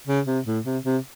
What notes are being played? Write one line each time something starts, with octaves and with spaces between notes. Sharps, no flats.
C#3
C3
A2
C3
C3